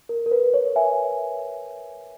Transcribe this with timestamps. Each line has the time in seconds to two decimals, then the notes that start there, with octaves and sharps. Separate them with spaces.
0.09 A#4
0.26 A#4
0.31 B4
0.54 C#5
0.76 E5 G#5